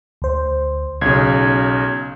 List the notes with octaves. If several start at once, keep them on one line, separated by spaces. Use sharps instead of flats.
D2 C5
B1 C#3 G#6